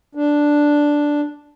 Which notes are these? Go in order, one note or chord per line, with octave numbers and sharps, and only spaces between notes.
D4